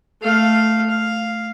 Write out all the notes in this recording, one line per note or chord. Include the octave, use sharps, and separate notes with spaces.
A3 F5
F5